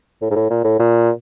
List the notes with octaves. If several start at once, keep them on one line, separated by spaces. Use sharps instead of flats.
A2
G#2
A2
A#2
A2
A#2